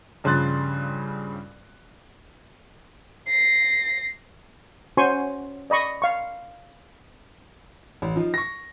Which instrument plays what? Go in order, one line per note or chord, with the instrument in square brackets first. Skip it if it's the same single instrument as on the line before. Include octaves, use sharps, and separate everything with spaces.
[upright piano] G2 C#3 F3 C6 F#6 A6
[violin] A#6 C7
[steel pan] C#4 F#4 C5 G#5 C6 C#6
D5 D#5 B5 C#6
F5 C#6
[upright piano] A1
F3 D#4 F4
C#6 A#6